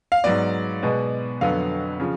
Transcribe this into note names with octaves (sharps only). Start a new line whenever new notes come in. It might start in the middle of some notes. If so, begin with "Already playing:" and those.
F5
G#2 F#3 B3 D5
B2 G#3 B3
F2 D3 F#3 B3 F5
C#3 F3